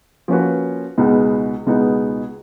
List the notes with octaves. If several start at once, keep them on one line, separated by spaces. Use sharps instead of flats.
F3 A#3 C#4 F#4 B4
C#2 B2 G#3 B3 D#4
C#2 B2 G#3 B3 D#4